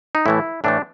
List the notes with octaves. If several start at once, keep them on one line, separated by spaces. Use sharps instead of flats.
D#4
A2 E3 A3 E4
A2 E3 A3 D4